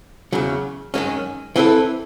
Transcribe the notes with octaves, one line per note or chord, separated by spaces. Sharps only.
E2 C#3 F#3
F#2 D#3 G#3 C#4
E3 C4 E4 A4